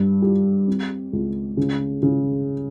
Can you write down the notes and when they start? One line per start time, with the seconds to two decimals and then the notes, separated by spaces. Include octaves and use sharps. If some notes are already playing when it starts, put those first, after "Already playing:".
Already playing: G2
0.22 G4
0.67 C4
1.13 C#2
1.57 C#3
2.03 C#3